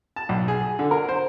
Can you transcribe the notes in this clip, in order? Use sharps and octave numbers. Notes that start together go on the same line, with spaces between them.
A5
B1
G#4
G#4
D3
A#4
C5